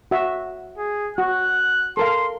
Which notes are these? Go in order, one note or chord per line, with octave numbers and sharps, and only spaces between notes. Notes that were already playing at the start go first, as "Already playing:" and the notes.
F#4 E5
G#4
F#4 F#6
A4 A#4 F5 C6